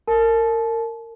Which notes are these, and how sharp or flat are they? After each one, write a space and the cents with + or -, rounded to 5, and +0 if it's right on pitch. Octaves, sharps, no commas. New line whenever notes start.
A#4 -30 A5 -35